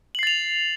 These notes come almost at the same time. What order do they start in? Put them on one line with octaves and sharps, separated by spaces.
F#7 C7 A6 F7